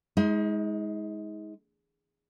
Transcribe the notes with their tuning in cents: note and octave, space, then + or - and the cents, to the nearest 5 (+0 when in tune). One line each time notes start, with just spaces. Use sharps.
G#3 +0 D#4 +40